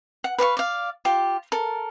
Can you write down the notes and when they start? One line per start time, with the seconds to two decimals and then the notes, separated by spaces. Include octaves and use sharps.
0.24 F#5
0.38 B4 D5 F5 C#6
0.57 D5 F5
1.05 F4 G4
1.52 A4 A#4